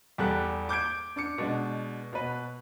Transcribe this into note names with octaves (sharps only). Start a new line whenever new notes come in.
E2 G3 G4 A4 F#6
D6 G6 G#6 D7
D4 D6 C#7
B2 G#3 D4
B2 B4